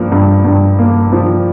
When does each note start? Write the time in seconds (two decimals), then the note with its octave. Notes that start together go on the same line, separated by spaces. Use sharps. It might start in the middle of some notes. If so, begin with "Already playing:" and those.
Already playing: G2 F3 A#3
0.12 G2
0.45 G2
0.79 A#3
1.12 F3